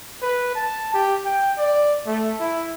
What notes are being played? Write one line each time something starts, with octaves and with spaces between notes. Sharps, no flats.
B4
A5
G4
G5
D5
A3
E4